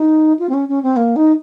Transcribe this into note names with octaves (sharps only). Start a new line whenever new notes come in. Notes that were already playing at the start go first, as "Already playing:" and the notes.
Already playing: D#4
F4
C4
C#4
C#4
C4
A#3
D#4